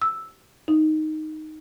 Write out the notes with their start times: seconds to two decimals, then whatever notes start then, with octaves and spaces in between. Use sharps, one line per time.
0.02 E6
0.68 D#4